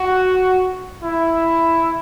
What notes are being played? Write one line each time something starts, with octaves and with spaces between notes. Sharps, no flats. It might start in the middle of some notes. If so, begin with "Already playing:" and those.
Already playing: F#4
E4